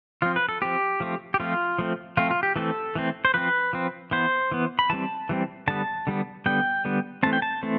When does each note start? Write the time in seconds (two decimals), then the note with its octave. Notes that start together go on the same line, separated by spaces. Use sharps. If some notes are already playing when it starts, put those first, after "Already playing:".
0.22 F3 C4 F4
0.36 B4
0.49 A4
0.62 F3 C4 G4
1.00 F3 A3 C4
1.34 G4
1.40 F3 A3 C4 F4
1.79 F3 A3 C4
2.17 F3 A3 C4 F4
2.31 F4
2.43 G4
2.56 E3 A3 C4 A4
2.95 E3 A3 C4
3.25 C5
3.34 F3 C4 B4
3.73 F3 C4
4.11 E3 B3 C5
4.52 E3 B3
4.79 B5
4.90 E3 G3 C4 A5
5.29 E3 G3 C4
5.68 D3 G3 B3 A5
6.07 D3 G3 B3
6.46 D3 G3 B3 G5
6.85 D3 G3 B3
7.23 E3 A3 C4 A5
7.33 G5
7.42 A5
7.63 E3 A3 C4